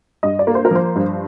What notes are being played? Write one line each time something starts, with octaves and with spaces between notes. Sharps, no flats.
G2 D#5
D5
A#3
C5
A#4
F3 C5
G2